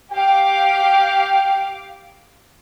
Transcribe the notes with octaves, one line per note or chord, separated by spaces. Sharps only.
G4 F5 G5 D6